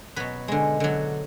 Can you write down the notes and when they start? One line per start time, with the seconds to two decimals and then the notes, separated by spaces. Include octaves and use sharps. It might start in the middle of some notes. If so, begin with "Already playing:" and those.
0.16 B2 F#3 B4
0.48 D3 G#3
0.80 D3 F#3